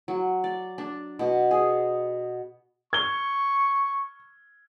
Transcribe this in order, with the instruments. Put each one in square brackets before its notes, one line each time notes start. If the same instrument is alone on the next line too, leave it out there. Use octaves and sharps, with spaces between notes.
[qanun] F#3
D5
D4
B2
G#4
[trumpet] C#6 [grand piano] G#6 G7